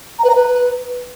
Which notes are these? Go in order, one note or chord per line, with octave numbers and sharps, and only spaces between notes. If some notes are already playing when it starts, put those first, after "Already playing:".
A#5
B4
A#5
B4